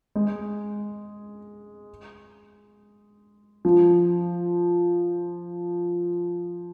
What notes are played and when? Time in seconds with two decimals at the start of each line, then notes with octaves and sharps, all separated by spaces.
0.16 G#3
3.65 F3